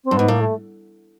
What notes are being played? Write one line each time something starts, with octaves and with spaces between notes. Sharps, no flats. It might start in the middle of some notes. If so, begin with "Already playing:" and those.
C4
G2
G#2 B3
A2 A#3
A3